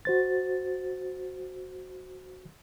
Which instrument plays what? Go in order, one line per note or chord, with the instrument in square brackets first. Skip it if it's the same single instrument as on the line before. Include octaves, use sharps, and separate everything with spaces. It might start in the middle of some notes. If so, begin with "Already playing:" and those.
[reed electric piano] F#4 C5 A6